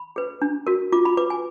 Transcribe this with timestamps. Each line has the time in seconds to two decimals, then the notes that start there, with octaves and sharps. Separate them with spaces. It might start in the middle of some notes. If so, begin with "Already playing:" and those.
Already playing: B5
0.16 G#4 B4
0.42 D4
0.67 F#4 A#4
0.92 F4 D6
1.05 B5
1.17 B4 D6
1.30 G#5